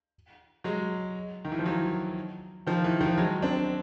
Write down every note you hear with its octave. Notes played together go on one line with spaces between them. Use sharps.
F#3 G#3
D#3
E3
F3
E3 F#3
D#3 F3
E3
D#3 F3
F#3 G#3
C4 D4